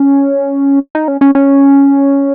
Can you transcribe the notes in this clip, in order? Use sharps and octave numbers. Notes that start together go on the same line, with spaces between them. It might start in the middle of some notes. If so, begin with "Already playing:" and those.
Already playing: C#4
D#4
C#4
C#4
C#4